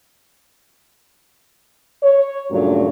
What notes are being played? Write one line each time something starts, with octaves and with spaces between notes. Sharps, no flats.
C#5
G2 A#2 C#3 F#3 A3